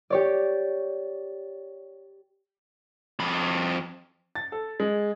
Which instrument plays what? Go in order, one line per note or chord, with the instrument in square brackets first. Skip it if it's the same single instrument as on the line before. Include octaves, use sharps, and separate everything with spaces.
[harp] G4 C#5 D5
[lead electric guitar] F2 B5
[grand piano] A6
A4
G#3